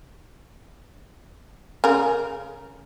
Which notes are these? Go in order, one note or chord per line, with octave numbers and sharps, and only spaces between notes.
C#3 A#4